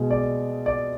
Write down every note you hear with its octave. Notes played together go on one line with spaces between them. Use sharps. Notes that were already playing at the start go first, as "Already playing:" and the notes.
Already playing: B2 G#3
D5
D5